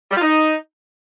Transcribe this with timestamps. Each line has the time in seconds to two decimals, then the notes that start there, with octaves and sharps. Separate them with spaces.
0.11 G3
0.16 F4
0.22 D#4